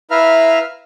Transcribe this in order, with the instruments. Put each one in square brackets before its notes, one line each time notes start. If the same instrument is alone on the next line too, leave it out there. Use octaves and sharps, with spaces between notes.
[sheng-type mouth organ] E4 B4 E5 F5 A#5 F6